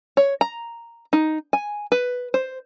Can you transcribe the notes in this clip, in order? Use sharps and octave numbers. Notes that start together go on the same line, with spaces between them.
C#5
A#5
D#4
G#5
B4
C5